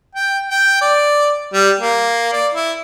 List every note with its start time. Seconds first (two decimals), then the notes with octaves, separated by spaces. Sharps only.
0.15 G5
0.50 G5
0.81 D5
1.54 G3
1.80 A#3
2.33 D5
2.54 E4